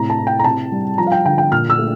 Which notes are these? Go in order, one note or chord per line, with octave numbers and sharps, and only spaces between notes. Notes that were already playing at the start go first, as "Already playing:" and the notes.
Already playing: A2 C3 A#5
A5
E4
G5
A#5
C3 A5
G3
F3 A#5
F5
G5
D3 G5
G5
A#2 F6
E6
A3